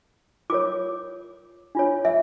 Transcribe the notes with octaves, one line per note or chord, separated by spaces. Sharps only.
F4 A#4 C#5 D6
D4 F4 C#5
E5